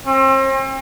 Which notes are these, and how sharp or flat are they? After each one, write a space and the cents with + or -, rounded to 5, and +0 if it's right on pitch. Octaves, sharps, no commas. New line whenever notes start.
C4 +40